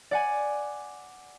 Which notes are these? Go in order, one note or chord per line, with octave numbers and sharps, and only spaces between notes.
D5 F#5 G#5